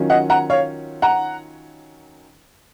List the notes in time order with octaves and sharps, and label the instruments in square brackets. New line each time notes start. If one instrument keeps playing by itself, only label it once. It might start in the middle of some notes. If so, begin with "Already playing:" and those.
Already playing: [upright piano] D#3 F#3 C#4 F4
D#5 F#5
F#5 A#5
C#5 F5
F#5 A#5